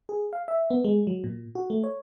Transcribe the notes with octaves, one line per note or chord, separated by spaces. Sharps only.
G#4
F5
E5
B3
G#3
F#3
A#2
F#4
A3
C#5